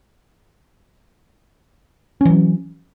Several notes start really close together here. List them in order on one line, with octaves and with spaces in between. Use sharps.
C#4 E3 F#3